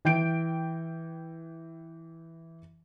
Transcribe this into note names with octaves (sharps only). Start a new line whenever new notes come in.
E3 G5 G6 D7